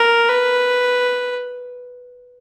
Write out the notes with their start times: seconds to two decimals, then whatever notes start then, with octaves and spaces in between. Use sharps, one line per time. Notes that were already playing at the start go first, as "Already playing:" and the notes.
Already playing: A#4
0.28 B4